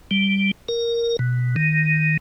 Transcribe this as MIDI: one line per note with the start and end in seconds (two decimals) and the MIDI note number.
0.11 0.51 55
0.69 1.17 70
1.19 1.56 47
1.56 2.17 51